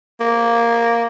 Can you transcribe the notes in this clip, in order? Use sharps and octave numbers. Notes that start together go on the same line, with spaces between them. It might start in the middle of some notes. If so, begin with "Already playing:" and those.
A#3